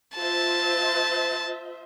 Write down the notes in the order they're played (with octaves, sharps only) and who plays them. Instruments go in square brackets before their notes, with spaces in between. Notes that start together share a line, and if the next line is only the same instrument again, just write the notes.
[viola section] F4 C5 E5 [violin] A5